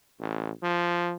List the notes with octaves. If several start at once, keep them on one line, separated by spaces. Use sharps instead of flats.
A1
F3